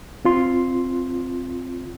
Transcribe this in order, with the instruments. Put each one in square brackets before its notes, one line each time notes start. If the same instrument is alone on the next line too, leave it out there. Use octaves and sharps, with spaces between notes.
[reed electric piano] C4 F4 C6